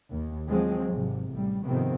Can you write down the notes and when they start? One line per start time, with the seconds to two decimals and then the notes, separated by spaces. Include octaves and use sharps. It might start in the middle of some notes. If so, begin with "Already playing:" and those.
0.11 D#2
0.49 F3 F#3 G#3 C4
0.87 G#1 C3
1.32 A1 G3
1.64 F2 G#2 C3 D#3 B3 C4